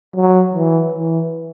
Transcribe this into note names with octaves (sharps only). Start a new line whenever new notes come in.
F#3
E3
E3